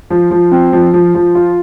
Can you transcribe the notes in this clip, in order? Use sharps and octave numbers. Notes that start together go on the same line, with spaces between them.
F3
F3
C4
F3
F3
F3
F4